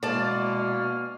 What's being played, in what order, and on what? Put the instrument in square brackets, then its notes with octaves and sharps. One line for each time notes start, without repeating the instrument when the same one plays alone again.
[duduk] B2 [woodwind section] E3 G#3 A#3 [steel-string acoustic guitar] D5 A5 [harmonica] C#6 F6